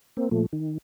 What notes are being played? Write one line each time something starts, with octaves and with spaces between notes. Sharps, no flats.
A#3 C4
A#2 F3 A3
D#3